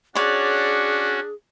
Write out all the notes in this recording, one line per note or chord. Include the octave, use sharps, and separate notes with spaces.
C#4 D4 F#4 G#4 C#5 D5